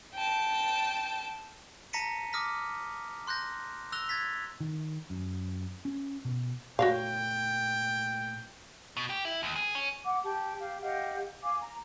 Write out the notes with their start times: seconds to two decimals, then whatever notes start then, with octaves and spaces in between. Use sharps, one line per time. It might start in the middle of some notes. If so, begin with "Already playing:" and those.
0.15 G5 A5
1.93 A5 A#5 A#6 B6 C#7 D#7
2.33 D6 D#6 F6 A#6 B6
3.27 C6 F#6 G6 A#6
3.92 E6 F#6 A#6 F7 G7
4.09 F#6 G#6 A6 B6
4.60 D#3
5.10 F#2
5.85 C#4
6.25 B2
6.79 A#2 A3 F#4 C#5 F5 G5
8.97 B2
9.10 G4
9.25 E4
9.43 D#2
9.56 G#4
9.75 C#4
10.04 F#5 D6
10.23 G4 A5
10.59 G4 F5
10.82 G4 D#5 F5 F#5
11.42 F5 G#5 D6
11.61 A#5